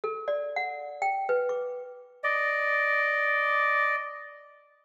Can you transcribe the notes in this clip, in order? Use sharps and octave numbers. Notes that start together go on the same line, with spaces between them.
A4
D5
F#5
G5
B4
D6
D5 D#5